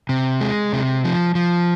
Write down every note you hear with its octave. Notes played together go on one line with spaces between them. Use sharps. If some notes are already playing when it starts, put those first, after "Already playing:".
C3
G#3
C3
F3
F3